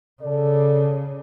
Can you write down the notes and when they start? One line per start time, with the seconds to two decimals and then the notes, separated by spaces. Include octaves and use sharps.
0.22 C#3 A4 D5